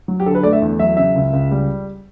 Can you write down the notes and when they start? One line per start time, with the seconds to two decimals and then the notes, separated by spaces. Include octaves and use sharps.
0.08 F#3
0.20 G4
0.26 D3 A4
0.35 B4
0.43 A3 D5
0.53 E5
0.62 E2
0.79 F#3 E5
0.97 C#3 E5
1.16 C#2
1.33 C#2
1.51 G3